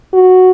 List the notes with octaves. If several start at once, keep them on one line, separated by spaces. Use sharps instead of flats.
F#4